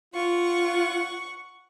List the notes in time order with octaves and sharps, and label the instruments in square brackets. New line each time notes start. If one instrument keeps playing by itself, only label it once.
[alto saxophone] F4 [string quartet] F#5 C#6